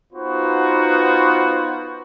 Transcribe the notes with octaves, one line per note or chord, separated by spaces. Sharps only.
B3 D#4 F4 F#4 B4 C5